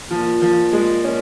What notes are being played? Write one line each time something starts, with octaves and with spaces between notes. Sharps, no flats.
A#2 F3
F3
G#3
C#4